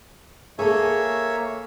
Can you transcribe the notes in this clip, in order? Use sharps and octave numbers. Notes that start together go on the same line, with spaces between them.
A#3 G#4 A4 C#5 E5